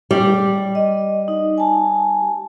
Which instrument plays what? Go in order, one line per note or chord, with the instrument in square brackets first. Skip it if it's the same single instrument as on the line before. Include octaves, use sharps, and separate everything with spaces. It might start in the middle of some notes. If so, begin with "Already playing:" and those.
[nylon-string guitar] G3
[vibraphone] D#5
D#4
G#5 A5